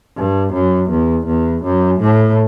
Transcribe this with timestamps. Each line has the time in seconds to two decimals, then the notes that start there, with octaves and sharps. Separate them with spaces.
0.17 G2
0.53 F#2
0.90 E2
1.26 E2
1.64 F#2
2.00 A2